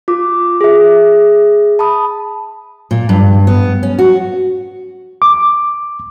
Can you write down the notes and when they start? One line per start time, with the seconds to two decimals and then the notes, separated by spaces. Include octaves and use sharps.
0.08 F4 D6
0.61 G#4 E5
1.79 A5 B5 D#6
2.91 A#2
3.09 G2
3.47 B3
3.83 C#4
3.99 F#4
5.22 D6